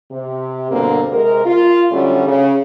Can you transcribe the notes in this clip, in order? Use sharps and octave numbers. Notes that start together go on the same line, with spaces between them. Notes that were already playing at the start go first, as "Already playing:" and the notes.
C3
G2 B2 D3 A#3 C4
C3 G#3 G#4 A#4
F4
D3 F#3 G3 A3 C#4
C#3